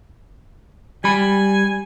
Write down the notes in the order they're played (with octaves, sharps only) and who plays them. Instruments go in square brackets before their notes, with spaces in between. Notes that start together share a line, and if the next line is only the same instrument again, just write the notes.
[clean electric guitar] G3 B5 [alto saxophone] G#5